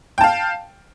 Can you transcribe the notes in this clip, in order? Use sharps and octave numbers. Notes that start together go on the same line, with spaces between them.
F5 G5 A5